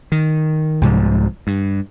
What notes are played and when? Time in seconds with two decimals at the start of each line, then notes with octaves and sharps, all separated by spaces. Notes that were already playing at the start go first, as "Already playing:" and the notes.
0.12 D#3
0.81 C2 G#2 C3 F3
1.47 G2